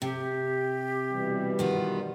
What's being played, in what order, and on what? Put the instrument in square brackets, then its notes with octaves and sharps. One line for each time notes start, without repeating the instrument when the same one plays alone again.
[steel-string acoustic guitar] C3 [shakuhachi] G4
[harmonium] B2 E3 G3
[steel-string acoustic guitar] D#3 B3 F4